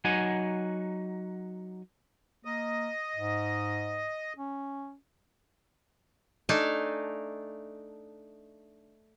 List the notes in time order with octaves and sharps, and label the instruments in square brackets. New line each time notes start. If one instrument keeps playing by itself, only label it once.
[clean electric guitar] F#3 D#4 F#5 G#5
[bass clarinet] A#3 [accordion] D#5
[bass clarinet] G#2
C#4
[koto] A3 D4 D#4 G#5 A5